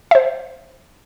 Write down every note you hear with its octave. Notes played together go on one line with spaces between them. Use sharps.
C5 E5